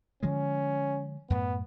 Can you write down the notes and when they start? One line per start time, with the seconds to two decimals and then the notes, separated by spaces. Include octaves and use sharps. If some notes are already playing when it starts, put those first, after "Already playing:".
0.23 D3 F3 G#3 C#4
1.30 F#2 A2 B3